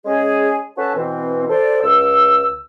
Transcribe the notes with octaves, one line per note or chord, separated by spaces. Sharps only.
G#3 C#4 G#4
C#4 F#4 A4 B4 A5
B2 E3 C4
A4 C5 D5
C#2 E6